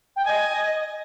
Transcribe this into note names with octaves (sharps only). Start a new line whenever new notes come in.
G5
D#5 G#5